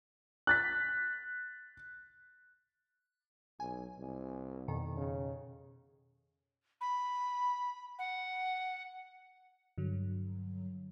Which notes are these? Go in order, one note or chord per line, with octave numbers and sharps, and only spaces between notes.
F#6 A6 B6
B1 G#5
C2
F2 B2 D#3
C#3
B5
F#5
G2 D3 F#3